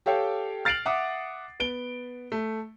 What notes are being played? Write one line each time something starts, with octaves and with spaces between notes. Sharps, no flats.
G4 A4 C#5 F5 G5
F6 A6 C7 D7 F7 F#7
E5 F#5 D6 D#6
B3 D7 G7
A3